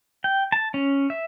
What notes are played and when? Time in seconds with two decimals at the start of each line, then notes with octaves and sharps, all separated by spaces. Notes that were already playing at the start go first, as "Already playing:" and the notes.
0.24 G5
0.52 A5
0.74 C#4
1.10 E5